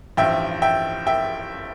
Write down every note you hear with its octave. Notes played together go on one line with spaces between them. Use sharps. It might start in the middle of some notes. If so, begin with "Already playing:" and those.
A1 G2 F3 E5 G5
E5 G5
E5 G5